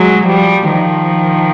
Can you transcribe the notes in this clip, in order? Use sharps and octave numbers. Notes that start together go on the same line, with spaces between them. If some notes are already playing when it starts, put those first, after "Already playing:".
Already playing: F#3 G#3
F3 G3
D#3 F3